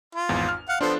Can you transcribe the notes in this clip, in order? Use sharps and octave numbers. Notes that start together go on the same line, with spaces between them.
F4
G#1 E2
F6
F5 F#5
F3 B3 D4 F4 A4 C5